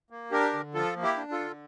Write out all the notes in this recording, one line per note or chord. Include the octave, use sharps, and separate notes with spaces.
A#3
D4 G4 A#4
D3
F3 F4 A4
A#3
E4 G4
D4
F4 A4
D3